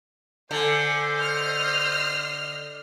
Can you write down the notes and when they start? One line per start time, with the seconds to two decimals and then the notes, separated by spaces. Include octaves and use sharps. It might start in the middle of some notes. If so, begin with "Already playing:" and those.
0.51 D3 C5 G#5
1.19 D#5 F6 C7